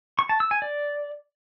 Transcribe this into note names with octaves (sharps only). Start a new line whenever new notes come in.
C#6
A5
E6
G#5
D5